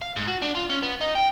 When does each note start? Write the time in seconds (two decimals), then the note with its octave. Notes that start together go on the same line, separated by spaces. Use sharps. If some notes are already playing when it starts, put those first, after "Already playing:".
0.02 F5
0.16 G#2
0.27 F#4
0.42 D4
0.55 F4
0.69 C#4
0.82 B3
1.01 D#4
1.15 G5